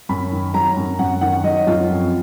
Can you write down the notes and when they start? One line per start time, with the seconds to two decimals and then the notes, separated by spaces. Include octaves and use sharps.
0.09 F#2 B5
0.32 D#3
0.54 F#3 A#5
0.77 F#2
0.99 F#2 F#5
1.21 D#3 F#5
1.44 F#3 D#5
1.67 F#2 F4
1.90 F2